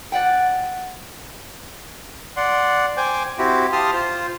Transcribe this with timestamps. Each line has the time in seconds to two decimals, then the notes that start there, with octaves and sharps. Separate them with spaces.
0.12 D5 F#5 G5
2.37 D5 F#5 C6
2.97 C5 G5 G#5 D6
3.38 C4 E4 F#4 G4
3.72 G4 F5 A5 C6 D#6 F6
3.93 F4 C5